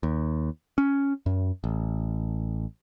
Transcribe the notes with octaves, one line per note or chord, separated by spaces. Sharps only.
D#2
C#4
F#2
A1